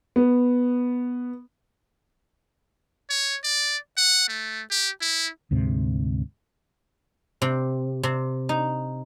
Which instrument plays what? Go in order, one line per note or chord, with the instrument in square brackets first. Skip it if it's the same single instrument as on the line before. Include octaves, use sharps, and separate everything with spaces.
[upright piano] B3
[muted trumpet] C#5
D5
F#5
A3
G4
E4
[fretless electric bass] D2 G#2 C3
[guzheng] C3
C3
D#4